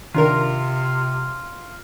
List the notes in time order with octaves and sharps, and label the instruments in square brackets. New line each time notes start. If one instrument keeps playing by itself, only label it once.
[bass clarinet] C3 [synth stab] D#3 D4 A#4 [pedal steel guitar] F4